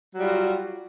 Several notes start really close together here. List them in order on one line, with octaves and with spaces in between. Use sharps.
F#3 G3 F4 F#4